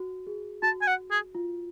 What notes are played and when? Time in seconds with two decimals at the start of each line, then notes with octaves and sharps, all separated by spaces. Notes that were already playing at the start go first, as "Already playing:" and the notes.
Already playing: F#4
0.27 G#4
0.62 F#4 A5
0.82 G#5
0.87 F#5
1.11 G#4
1.35 F4